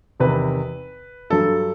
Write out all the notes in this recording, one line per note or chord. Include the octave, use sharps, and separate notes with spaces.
E2 C3 D#3 B4
G2 F#3 A4